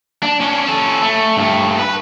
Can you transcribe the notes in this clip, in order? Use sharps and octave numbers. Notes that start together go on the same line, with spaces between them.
D4
C#4 D4
C#4 A4
A3
G2 A3
B4